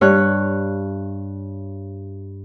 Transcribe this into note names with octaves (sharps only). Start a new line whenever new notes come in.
G2 C#5 F#6